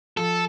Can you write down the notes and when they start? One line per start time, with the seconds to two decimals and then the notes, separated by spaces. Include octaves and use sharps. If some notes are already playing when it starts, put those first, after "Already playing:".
0.17 F3 A4